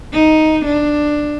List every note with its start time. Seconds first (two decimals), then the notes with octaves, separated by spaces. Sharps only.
0.12 D#4
0.64 D4